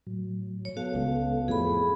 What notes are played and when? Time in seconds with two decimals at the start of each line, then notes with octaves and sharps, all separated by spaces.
0.07 A2 F#3
0.65 C#5
0.77 B3 F#4 A4 F5
0.95 C#2
1.48 F2 A2 G#4 B5